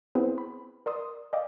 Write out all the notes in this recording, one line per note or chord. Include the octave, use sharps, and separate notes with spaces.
B3 C4 E4 G#4 B4 C5
B5
A#4 D5 C6 D#6
D5 D#5 F5 G5 D6